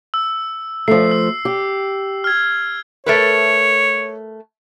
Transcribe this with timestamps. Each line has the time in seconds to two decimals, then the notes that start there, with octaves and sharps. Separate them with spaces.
0.14 E6
0.88 F3 A3 C7
1.11 E6
1.45 G4
2.24 F6 G#6
3.06 A3 A#4 B4 C#5